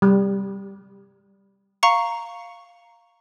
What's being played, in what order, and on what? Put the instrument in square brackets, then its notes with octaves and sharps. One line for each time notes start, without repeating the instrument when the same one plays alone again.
[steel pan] G3
[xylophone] F5 A#5 C#6 C#7